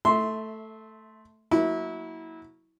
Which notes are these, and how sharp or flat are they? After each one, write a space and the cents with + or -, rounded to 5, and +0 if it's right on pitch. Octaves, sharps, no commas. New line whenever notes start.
A3 +0 E5 -20 C6 +0
F#3 -10 A#3 +5 E4 -25